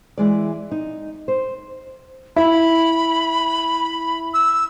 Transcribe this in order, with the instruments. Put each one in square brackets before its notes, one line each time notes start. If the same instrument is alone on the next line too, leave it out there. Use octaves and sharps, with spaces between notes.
[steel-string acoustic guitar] E3 G#3 D5
D#4
C5
[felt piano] E4 [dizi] B5
[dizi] E6